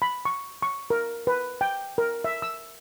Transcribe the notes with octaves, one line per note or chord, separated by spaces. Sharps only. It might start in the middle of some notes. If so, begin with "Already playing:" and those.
B5
C#6
C#6
A#4
B4
G5
A#4
E5
E6